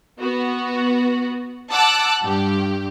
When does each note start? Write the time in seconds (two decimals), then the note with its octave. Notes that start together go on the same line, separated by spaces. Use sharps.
0.19 B3 F#4
1.72 F#5 A5 D6 E6 F#6
2.23 G2 G4